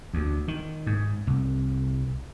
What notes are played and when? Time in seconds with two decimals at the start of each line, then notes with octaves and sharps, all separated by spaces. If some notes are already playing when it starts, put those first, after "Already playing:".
0.14 D2
0.48 D#3
0.87 G#2
1.27 C2